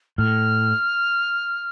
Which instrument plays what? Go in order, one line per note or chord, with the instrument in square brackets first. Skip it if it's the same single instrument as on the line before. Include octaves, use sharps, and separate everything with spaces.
[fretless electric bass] A2 [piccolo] F6